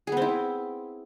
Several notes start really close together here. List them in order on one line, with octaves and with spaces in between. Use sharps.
G#4 B3 C4 E4